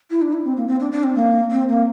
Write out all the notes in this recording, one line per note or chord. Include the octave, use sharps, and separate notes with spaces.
E4
D4
E4
C4
A#3
C4
D4
D4
C4
A#3
C4
A#3